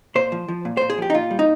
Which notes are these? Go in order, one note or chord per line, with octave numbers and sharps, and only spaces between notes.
A#2 C5
F3
F3
A#2
A#2 C5
G#4
F3 G4
D#4
A#2 F4
G3
D#4